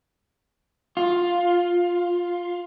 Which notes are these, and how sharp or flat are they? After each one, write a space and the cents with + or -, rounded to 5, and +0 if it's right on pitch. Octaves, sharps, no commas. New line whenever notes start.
F4 +10